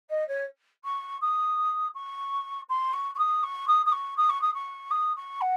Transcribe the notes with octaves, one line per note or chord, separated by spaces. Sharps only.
D#5
C#5
C#6
D#6
C#6
C6
C#6
C#6
D#6
C#6
D#6
D#6
C#6
D#6
C#6
D#6
C#6
D#6
C#6
F#5